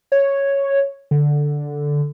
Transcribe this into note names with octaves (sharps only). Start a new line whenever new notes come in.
C#5
D3